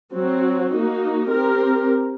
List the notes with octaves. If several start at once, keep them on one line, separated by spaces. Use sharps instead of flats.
F#3 C4 F#4
A#3 D#4 F#4
C4 G4 A#4